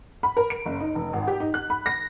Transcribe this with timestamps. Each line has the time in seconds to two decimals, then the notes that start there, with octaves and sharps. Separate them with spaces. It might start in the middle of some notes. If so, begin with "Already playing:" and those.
0.23 B5
0.37 A#4
0.50 D7
0.66 F#1
0.80 D#4
0.95 F1
1.13 G#1
1.28 G4
1.40 D#4
1.54 F#6
1.70 B5
1.86 A#6